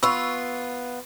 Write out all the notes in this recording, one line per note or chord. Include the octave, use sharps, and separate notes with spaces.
B3 F4 B5 C#6 E6